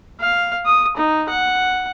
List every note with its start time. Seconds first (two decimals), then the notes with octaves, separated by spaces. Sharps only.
0.20 F5
0.66 D#6
0.97 D#4
1.30 F#5